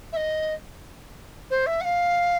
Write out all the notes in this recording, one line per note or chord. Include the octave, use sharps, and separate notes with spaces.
E5
D#5
C5
E5
F#5
F5